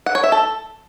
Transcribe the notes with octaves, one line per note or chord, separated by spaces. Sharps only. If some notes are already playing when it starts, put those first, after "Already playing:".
F#5
C#5
E5
A4